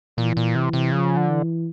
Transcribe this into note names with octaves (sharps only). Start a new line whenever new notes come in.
A#2 E3
A#2
C3
C3
C#3 F3
D3
E3